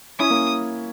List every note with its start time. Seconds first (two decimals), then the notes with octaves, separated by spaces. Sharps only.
0.19 C#4 E4 D#6
0.30 A#3 C#4